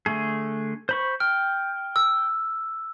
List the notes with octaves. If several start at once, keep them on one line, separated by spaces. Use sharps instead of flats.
D3 A3 G#4
C5 B5 C#6
G5 F6
E6